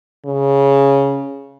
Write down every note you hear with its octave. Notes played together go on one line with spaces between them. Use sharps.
C#3